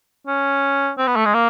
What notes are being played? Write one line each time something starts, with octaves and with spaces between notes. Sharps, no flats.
C#4
C4
B3
A3
G#3
A#3